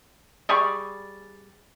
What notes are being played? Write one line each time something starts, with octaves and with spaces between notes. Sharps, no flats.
G3 G#4 D5 C#6